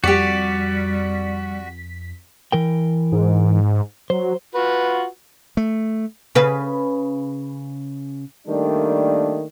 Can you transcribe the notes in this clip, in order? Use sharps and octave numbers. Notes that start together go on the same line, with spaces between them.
F2 G3 F#4 G4 D5 B6
E3 A#4 G5
G#2
F#3 C5
F4 F#4 B4
A3
C#3 B4
D#3 G3 A3 A#3 D4